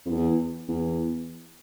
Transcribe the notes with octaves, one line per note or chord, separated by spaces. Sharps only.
F2
E2
E2